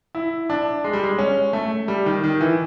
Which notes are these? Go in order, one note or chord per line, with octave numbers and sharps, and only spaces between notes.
E4
D4
G#3
G3
G#3
C#4
A3
G3
D#3
D#3
E3